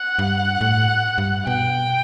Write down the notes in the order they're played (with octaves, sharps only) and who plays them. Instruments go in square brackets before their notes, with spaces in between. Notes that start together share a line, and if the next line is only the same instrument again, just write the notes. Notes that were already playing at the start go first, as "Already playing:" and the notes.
Already playing: [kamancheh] F#5
[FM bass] G2
A2
G2
[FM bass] B2 [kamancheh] G5